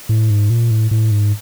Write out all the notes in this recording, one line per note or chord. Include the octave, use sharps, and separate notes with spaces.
A2
G#2
A#2
A2
A2
G#2